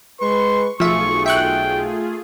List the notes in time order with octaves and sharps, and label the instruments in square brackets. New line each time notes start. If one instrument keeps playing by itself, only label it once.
[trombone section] G#3 B4 [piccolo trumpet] C6 [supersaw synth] C#6
[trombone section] B1 [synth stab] F3 E5 [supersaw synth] A3 F4 G#4 [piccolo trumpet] C#6
[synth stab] E5 C#6 F#6 [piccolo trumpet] G5